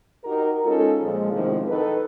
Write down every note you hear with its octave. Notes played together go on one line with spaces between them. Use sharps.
D#4 F#4 G4 A#4
G#3 C#4 D#4 F4 A4
A#2 F3 G#3
F#2 A2 C3 D#3 F3 G#3
D#3 D#4 A4 B4